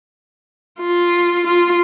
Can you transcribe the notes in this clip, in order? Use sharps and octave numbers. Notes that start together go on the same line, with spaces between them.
F4
F4